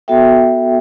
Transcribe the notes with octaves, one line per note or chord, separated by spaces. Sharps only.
B3 F#4 A4 E5 G5